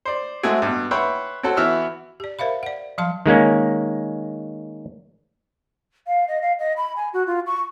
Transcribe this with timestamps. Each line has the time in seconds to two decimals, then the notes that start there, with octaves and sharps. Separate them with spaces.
0.05 C5 D5
0.43 G#3 A3 C4 F#4 G#4
0.62 G2 B2
0.91 B4 C#5 E5 F#5 G5 C6
1.43 C4 C#4 F#4 A4
1.57 E3 B3 F#4 E5 E6 F6
2.20 G4 D5
2.39 A#4 C5 E5 F5 B5
2.63 D5 F#5
2.98 F3 F#3 F5 A5 C6
3.26 D#3 G#3 A#3 C#4
6.07 F5
6.28 D#5
6.42 F5
6.59 D#5
6.77 B5
6.96 G#5
7.13 F#4
7.27 F4
7.47 C#6